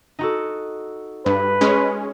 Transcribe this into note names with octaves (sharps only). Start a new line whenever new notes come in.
D#4 F#4 A4
G2 B4
G#3 C#4